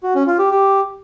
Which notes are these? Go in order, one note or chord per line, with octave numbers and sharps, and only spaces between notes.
F#4
C#4
F4
G4
G4